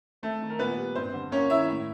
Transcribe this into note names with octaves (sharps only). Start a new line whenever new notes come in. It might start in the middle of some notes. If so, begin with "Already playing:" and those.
A3 C4 A4
D#3
A#4
A#2 B3 B4
G3
G2 C4 C5
D3
A#3 C#4 C#5
D#3 E4 E5
A2